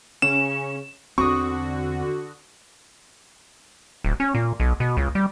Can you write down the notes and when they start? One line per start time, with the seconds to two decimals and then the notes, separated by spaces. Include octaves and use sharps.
0.22 C#3 C#4 E7
1.18 E2 D3 C4 F#4 C#6 D#6
4.04 D1
4.20 C#4
4.35 A#2
4.60 B1
4.80 B2
4.97 C#2
5.15 G3